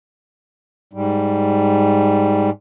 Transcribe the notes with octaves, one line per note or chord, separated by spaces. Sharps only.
G#2 G3